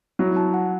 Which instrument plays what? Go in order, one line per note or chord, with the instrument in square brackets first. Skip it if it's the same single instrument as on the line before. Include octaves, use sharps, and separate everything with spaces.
[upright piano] F#3 [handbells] E4
[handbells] A5
F#5